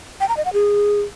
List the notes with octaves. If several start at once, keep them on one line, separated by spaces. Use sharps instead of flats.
G5
A#5
D#5
F#5
G#4